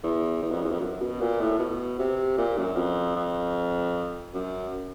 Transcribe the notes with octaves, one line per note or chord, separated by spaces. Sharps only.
E2
E2
F2
E2
F2
F#2
B2
A#2
A2
B2
C3
A#2
F#2
F2
F2
F#2